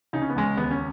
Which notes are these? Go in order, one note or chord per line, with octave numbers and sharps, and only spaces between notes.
C#3 D#4
C#4
B3
C#2 G#3 C#4
D#2 B3
C#4